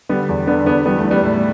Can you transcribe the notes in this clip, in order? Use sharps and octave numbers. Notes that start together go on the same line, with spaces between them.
D3 G3 B3
E2
D3 B3 D4
E2 B3 D4
E3 G3 B3
A3
E3
G3 B3
A2 A3